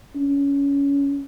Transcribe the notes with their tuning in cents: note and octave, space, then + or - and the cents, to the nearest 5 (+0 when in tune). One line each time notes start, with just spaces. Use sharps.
C#4 +20